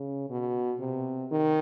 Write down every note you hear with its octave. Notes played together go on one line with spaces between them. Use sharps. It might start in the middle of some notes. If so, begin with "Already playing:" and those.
Already playing: C#3
B2
C3
D#3